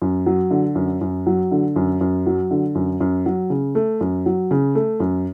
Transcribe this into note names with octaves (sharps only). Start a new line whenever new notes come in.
F#2
F#3
D3
F#2
F#2
F#3
D3
F#2
F#2
F#3
D3
F#2
F#2
F#3
C#3
A3
F#2
F#3
C#3
A3
F#2